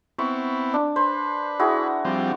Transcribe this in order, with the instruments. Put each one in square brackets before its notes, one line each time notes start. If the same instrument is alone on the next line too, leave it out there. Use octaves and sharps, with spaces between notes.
[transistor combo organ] B3 C4 E4 [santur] C#6
[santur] D4
[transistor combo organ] B4 [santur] C5
[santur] E4 F#4 G#4
[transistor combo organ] F3 G3 C4